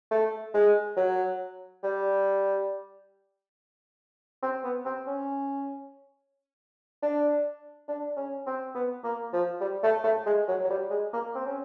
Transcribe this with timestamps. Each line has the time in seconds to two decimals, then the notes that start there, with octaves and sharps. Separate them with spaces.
0.11 A3
0.54 G#3
0.96 F#3
1.83 G3
4.43 C4
4.64 B3
4.85 C4
5.07 C#4
7.03 D4
7.88 D4
8.17 C#4
8.46 C4
8.75 B3
9.04 A#3
9.33 F3
9.61 G3
9.84 A3
10.04 A3
10.26 G#3
10.48 F#3
10.64 F#3
10.70 G3
10.90 G#3
11.13 A#3
11.35 C4
11.46 C#4